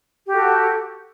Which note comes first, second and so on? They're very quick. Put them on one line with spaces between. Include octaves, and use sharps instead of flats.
G4 F#4 A4